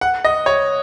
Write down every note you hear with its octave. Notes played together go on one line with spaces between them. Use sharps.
F#5
D#5
C#5